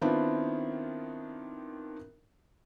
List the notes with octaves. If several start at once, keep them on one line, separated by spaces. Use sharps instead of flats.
D#3 B3 C4 D4 E4 F4